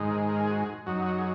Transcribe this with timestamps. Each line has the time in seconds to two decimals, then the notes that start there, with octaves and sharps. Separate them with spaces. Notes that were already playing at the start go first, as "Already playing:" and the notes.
Already playing: G#2 D#3 G#3
0.10 A#4
0.29 A#4
0.40 G#4
0.51 F#4
0.62 G#4
0.86 F#2 F#3 D#4 F#4
1.06 F#4
1.18 G#4